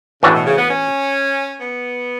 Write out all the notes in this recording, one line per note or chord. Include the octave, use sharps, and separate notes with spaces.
A2 C#3 E3 A3 D4 F#4
B2
C#3
B3
C#4
B3